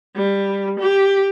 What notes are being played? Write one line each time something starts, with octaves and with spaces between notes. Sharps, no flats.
G3
G4